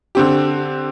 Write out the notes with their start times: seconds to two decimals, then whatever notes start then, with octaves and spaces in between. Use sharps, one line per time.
0.15 D3 C4 G4